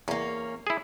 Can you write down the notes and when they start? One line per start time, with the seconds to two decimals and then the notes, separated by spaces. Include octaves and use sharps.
0.08 E2 A#3 C#4
0.67 E4 G#4